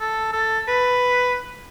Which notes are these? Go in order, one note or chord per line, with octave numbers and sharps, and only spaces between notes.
A4
A4
B4